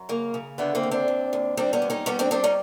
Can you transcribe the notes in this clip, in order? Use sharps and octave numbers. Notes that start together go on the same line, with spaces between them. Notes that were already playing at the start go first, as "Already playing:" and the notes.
Already playing: F#2
C#3 A#3
C#3
D3 A3 B3
A#3 C4
D#2
C4 D4
D#2
D#2
G3 C4 D4
B3 C#4
D#2
C#4 D#4
G3 B3 C#4
C4 D4
G3 C4 D4
C#4 D#4